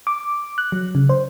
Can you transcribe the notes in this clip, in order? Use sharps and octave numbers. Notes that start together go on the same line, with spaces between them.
D6
F#6
F#3
C#3
C5